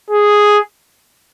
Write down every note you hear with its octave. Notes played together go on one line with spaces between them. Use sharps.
G#4